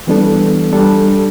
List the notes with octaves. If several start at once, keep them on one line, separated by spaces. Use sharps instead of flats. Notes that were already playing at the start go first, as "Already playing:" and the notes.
E3 G3 B3 D4 A4
G3 D4 A4